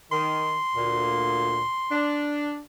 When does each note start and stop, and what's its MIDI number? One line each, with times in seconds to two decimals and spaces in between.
0.12 0.57 51
0.12 2.30 84
0.75 1.63 38
0.75 1.63 46
1.92 2.59 62